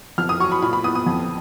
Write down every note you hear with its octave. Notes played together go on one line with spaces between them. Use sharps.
F2 F6
D#6
F#3 C#6
B5
A#2 B5
B5
B3 D#6
D#6
F2